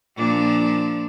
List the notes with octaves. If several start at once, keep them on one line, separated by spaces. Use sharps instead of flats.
A#2 F3 D4